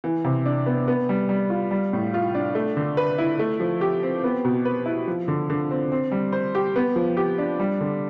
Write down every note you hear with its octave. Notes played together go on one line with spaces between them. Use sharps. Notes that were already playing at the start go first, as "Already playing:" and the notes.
E3
C3
D4
B3
B3
G3
G3
F4
G3
A2
F4
D4
A3
D3
B4
E4
A3
F3
G4
C4
B3
B2
B4
E4
F3
D3
D3
C4
C4
G3
C5
G4
B3
F3
G4
D4
G3
D3